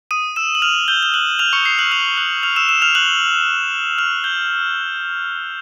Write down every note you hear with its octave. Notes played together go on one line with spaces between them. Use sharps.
D#6 D#7
E6 E7
F#7
F6 F7
G6 G7
G7
F#6 F#7
F6 F7
C#6 C#7
C7
F#6 F#7
F6 F7
F#6 F#7
F6 F7
E6 E7
E6 E7
F6 F7
F#6 F#7
F6 F7
G6 G7